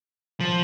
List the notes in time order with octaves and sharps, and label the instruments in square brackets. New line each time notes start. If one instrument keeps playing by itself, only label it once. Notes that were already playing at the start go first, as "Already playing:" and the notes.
[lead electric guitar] F3